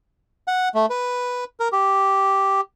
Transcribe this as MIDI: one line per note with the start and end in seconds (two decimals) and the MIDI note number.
0.48 0.69 78
0.75 0.86 57
0.90 1.44 71
1.60 1.68 70
1.72 2.61 67